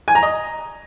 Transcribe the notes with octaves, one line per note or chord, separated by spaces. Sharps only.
G#5
A#5
D#5